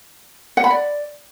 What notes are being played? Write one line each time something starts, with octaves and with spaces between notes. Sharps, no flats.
F#5
B5
D5